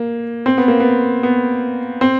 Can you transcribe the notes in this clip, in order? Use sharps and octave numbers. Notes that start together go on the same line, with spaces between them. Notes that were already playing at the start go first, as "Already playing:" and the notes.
Already playing: A#3
C4
B3
A#3
B3
B3
C4